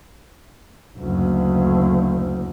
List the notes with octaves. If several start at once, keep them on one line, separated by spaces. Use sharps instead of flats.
F#1 D2